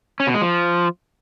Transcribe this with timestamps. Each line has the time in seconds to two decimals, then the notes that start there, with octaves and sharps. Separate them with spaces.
0.20 C#4
0.27 B2
0.34 G#3
0.42 F3